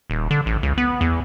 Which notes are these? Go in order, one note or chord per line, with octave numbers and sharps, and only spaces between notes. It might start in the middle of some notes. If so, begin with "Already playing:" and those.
D#1
D3
A1
C#2
B3
E2